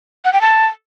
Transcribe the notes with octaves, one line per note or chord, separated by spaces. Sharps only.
F#5
G5
A5